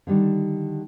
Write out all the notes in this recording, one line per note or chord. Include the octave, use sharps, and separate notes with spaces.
D3 D#3 G3 D4